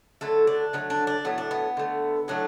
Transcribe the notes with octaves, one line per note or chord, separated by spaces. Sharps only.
D3 F#3 A3 A4
D4
D3 F#3 A3 B3
D4
D4
A2 F#3 A3 B3
D4
B3
D3 A3
A2 F#3 A3 D4